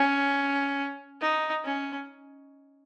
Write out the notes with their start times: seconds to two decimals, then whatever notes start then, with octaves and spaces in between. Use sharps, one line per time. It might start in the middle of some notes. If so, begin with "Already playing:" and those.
Already playing: C#4
1.21 D#4
1.64 C#4